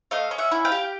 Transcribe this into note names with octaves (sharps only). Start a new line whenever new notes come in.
A3 D#5 F5
C#4
E5 F#5
E4
F5 G5
G4